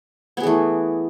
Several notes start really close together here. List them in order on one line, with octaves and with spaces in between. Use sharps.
B3 G#4 E3 A3